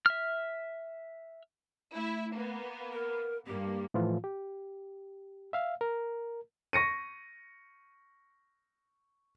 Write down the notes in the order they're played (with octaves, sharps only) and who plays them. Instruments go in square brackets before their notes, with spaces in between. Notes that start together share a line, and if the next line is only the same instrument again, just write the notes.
[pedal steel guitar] E5 F6
[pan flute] A3 [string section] E4 E5
[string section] A#3 B3
[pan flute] A#4
[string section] G2 A#3 [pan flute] G4
[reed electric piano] A2 E3 F3 F4
G4
E5 F5
A#4
[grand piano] C#6 A#6 C#7 D#7